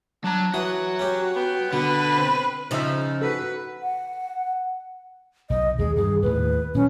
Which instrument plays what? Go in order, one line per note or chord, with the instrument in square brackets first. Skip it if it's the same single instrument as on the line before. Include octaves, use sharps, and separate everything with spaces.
[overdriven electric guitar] F#3 A#5 [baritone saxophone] D4
[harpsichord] E3 D#6 [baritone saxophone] F#3 [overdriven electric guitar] F#4
[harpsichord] C#4 G4
[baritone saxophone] B3 [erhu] G5
[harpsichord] B2 [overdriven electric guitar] D3 [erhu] B4
[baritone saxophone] C4
[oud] C#3 F3 [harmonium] D#4 [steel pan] C5 E5
[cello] F#4 B4 [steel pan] A4
[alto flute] F#5
[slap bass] B1 [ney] D#5
[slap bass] D#2 G#3 [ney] G#4
[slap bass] G2 D#3 E3 [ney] G#4
[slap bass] D#2 A2 [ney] B4
[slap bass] A#2 D#3 F#3 [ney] C#4